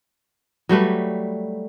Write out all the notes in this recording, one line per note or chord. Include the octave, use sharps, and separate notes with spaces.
F#3 G3 A3 B4